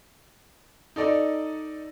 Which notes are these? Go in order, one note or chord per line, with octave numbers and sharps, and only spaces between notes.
D#4 A4 D5 D#5